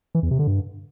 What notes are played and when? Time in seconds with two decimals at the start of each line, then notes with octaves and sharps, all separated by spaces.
0.15 E3
0.23 E2
0.31 C3
0.39 D3
0.47 G2